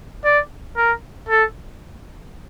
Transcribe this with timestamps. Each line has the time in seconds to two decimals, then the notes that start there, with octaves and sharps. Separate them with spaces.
0.25 D5
0.77 A#4
1.29 A4